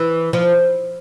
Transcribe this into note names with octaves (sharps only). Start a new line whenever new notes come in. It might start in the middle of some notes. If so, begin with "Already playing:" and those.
Already playing: E3
F3